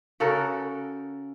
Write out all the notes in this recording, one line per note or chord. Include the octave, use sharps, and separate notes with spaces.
C#3 F#4 A4 A#4